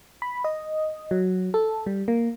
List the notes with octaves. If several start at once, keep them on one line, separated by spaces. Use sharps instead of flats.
B5
D#5
F#3
A4
G3
A#3